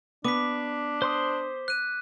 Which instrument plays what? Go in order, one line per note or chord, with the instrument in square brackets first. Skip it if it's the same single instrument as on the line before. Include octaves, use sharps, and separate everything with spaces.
[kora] B3 [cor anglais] D4 [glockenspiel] D6 B6
[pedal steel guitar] C5 C6 D#6
[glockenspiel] F#6 D#7